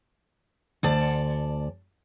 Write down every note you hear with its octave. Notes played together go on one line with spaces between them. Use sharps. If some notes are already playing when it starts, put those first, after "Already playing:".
D2 D5 A5